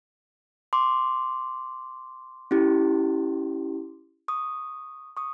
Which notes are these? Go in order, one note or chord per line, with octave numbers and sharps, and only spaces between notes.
C6 D6
C#4 E4 G4
C#6 D#6
C#6 D#6